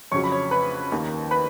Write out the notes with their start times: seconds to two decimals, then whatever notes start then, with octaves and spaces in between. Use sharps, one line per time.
0.11 F2 C#3 F#3 C#5 C#6
0.24 B5
0.31 C#5 C#6
0.51 B4 B5
0.92 D#2 D#3 A#3
1.31 B4 B5